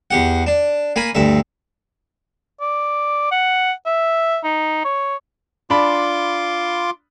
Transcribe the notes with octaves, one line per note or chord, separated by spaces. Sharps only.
E2 G4 F#5
D4
A#3 G#5 B5
D2 G2 E5
D5
F#5
E5
D#4
C#5
D4 F4 B5 C6 D6